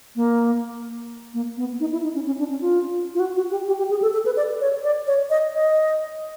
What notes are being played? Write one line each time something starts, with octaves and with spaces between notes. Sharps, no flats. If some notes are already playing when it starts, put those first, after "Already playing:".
A#3
A#3
B3
D#4
E4
D#4
C#4
C#4
D4
C#4
F4
F4
F#4
F#4
G4
G4
G4
G#4
A4
A4
B4
D5
C#5
D5
C#5
D#5
D#5